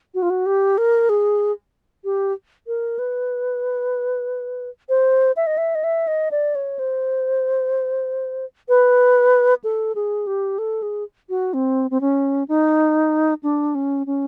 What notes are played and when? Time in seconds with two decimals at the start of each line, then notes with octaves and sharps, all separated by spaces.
0.14 F#4
0.22 F4
0.30 F#4
0.46 G4
0.78 A#4
1.09 G#4
2.04 G4
2.67 A#4
2.99 B4
4.89 C5
5.36 E5
5.47 D#5
5.58 E5
5.75 D#5
5.84 E5
6.07 D#5
6.31 D5
6.55 C#5
6.79 C5
8.69 B4
9.64 A4
9.95 G#4
10.27 G4
10.58 A4
10.82 G#4
11.29 F#4
11.54 C4
11.91 C4
12.01 C#4
12.48 D#4
13.43 D4
13.75 C#4
14.07 C#4